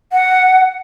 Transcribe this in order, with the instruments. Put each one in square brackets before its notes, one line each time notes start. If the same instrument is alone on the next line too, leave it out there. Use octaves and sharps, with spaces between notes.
[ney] F#5